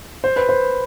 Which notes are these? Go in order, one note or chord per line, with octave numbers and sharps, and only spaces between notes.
C5
B4
C5